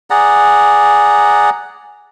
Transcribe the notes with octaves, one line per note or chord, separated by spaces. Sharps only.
G#4 D5 F#5 A#5